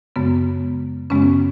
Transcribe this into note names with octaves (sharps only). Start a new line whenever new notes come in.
F#2 C#3 G#3 B3
F#2 C#3 G#3 B3 C#4